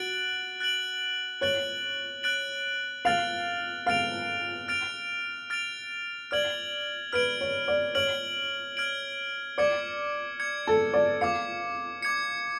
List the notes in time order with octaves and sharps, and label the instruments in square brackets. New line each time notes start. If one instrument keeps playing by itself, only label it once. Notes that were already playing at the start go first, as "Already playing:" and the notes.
Already playing: [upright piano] F#4 [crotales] F#6 A6 D7 F#7
[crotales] F#6 A6 D7 F#7
[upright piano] C#5 [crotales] F#6 A6 D7 F#7
[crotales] F#6 A6 D7 F#7
[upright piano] F5 [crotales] F6 A6 D7 F7
[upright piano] F5 [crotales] F6 A6 D7 F7
[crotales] F6 A6 D7 F7
F6 A6 D7 F7
[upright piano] D5 [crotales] F6 G#6 D7 F#7
[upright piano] B4 [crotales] F6 G#6 D7 F#7
[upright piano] C#5
D5
[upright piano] C#5 [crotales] F6 G#6 D7 F#7
[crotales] F6 G#6 D7 F#7
[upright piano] D5 [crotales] D6 G#6 C#7
[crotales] D6 G#6 C#7
[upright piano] A4
D5
[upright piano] F5 [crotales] D6 G#6 C#7
[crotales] D6 G#6 C#7